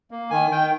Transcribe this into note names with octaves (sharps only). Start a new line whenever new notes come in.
A#3
D#3 G#5
D#3 G5